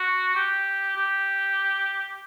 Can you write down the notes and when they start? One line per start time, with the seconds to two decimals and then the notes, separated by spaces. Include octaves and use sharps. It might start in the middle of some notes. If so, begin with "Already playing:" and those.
Already playing: F#4
0.36 G4
0.96 G4